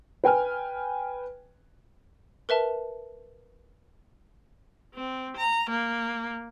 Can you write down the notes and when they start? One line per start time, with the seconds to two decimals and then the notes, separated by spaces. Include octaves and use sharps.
0.24 B4 G5 G#5 F6
2.49 A#4 B4 E5 A5
4.94 C4
5.36 A#5
5.70 A#3